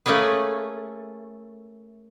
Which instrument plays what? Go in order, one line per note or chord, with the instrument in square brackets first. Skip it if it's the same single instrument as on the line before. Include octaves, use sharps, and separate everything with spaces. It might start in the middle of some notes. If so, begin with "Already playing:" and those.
[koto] A3 A#3 C#4 G#4 B4